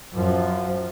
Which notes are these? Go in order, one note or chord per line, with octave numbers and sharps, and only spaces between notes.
F#2 F3